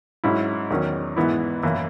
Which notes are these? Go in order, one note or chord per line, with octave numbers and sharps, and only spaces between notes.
G#2 F#3 C#4 E4
E2 D#3 F#3 C#4
G#2 E3 B3 E4
F#2 E3 A#3 E4